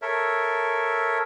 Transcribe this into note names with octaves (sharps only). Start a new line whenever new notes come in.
A4 A#4 C#5 E5